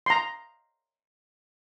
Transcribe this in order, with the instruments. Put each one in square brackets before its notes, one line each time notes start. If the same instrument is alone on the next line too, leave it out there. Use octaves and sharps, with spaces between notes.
[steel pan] A#5 C6